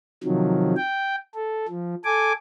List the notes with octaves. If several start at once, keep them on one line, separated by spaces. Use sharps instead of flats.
C3 D#3 F3 F#3
G5
A4
F3
A4 G#5 D6